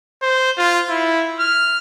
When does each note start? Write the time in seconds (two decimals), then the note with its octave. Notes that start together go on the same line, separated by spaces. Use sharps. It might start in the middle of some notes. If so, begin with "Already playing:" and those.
0.22 C5
0.58 F4
0.89 E4
1.40 F6